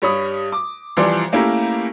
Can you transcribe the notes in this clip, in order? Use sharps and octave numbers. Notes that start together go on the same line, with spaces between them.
G2 G3 C#5 B5 D#6
D6
C2 E3 F3 D5 C6
A3 A#3 C#4 E4 G4 A#4